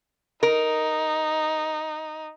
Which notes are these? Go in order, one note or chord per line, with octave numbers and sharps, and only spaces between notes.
D#4 A#4